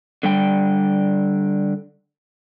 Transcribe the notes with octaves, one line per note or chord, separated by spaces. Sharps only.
D3 G3 G5